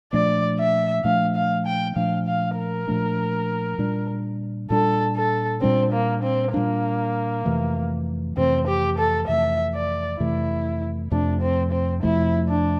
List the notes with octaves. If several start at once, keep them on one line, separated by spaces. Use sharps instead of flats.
A#2 F3 A3 D4 D5
E5
A#2 F3 A3 D4 F5
F5
G5
A#2 F3 A3 D4 F5
F5
A#4
A#2 F3 A3 D4
A#2 G3 D4
A#2 G3 D4 A4
A4
A#2 G3 C4 D4
A#3
C4
A#2 G3 A#3 D4
F2 C3 E3 A3
F2 C3 E3 A3 C4
G4
A4
F2 C3 E3 A3 E5
D5
F2 C3 E3 A3 E4
F2 C3 F3 A3 D4
C4
C4
F2 C3 F3 A3 E4
D4